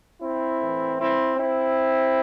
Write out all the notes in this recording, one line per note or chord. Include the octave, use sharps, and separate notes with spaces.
C4 E4
A2 E3
C4 E4
C4 E4